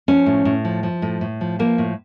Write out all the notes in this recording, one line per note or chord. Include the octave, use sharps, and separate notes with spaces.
F3 C#4
A2
A2
F3
F3
A2
A2
F3
F3 A#3
A2